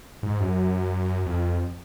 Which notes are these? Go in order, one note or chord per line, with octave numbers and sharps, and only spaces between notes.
G#2
F#2
F2